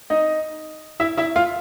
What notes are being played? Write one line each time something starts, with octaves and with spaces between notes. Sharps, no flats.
D#4 D#5
E4 E5
E4 E5
F4 F5